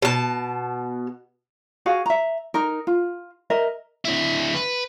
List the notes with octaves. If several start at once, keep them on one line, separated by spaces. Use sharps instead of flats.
B2 A5
F#4 G#4 F5
E5 A#5
D#4 A#4
F4
A#4 D#5 E5
D4 E4
B4